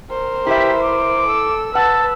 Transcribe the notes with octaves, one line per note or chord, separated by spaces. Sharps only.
A#4 C5
E4 G4 B4 E5
D6
A4 E6
B4 F#5 A5 E6